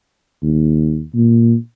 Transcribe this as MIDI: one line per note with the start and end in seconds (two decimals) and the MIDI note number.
0.42 1.03 39
1.15 1.55 46